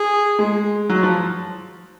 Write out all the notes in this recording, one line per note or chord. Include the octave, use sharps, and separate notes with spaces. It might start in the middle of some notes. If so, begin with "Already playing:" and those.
Already playing: G#4
G#3
F#3
F3